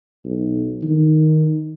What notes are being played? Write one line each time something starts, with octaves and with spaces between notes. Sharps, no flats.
B1
D#3